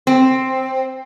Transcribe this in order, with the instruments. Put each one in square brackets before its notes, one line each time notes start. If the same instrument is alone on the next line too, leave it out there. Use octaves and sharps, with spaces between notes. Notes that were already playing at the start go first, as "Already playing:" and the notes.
[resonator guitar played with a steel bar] C4